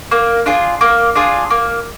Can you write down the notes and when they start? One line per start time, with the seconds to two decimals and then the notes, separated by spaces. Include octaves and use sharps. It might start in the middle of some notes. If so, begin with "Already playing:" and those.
0.11 A#3
0.46 D4 F4 G#4
0.81 A#3
1.15 D4 F4 G#4
1.50 A#3